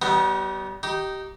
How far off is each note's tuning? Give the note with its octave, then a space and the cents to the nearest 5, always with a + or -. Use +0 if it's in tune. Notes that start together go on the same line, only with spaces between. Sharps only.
G3 -35 B3 +0 D#4 -5
D#4 +0 G4 -20